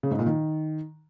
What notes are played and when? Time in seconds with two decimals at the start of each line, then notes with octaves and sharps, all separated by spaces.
0.03 C#3
0.11 G#2
0.19 A#2
0.26 D#3